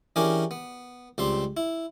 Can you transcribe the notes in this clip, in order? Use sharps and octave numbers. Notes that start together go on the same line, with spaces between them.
E3 C#4 D4 G4 G#4 A#4
B3
C#2 G3 C4 C6
E4